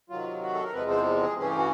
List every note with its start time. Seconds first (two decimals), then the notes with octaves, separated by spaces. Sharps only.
0.10 C3 D#3 F#3 F4
0.42 F#4
0.54 A4
0.64 A#4
0.73 E2 C3 F3 G#3 C4 B4
0.90 C5
1.23 G#4
1.38 G2 E3 A3 C#4 G#4
1.47 G4
1.58 F#4